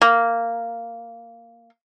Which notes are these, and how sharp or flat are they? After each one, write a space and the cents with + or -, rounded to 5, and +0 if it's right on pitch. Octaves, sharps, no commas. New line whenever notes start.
A#3 -10